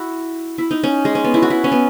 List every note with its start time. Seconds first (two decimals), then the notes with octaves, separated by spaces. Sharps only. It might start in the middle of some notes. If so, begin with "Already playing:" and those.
Already playing: E4 F#4
0.58 E4
0.71 D#4
0.84 C#4
1.05 G#3
1.15 C#4
1.24 B3
1.34 E4
1.42 F#4
1.50 E4
1.64 C#4
1.72 B3